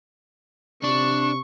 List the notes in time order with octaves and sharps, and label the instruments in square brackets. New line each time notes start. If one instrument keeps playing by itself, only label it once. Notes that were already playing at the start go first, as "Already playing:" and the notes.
[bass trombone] C3 [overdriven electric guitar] D4 [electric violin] C#6